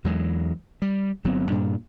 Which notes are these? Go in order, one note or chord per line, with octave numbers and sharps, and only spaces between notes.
E2 E3 F#3 G#3
G3
G1 F#3 B3 C4
G2 A#2 G3 D4